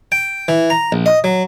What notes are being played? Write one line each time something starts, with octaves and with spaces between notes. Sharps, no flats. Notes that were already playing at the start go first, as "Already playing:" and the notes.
G5
E3
A#5
A#1
D#5
F#3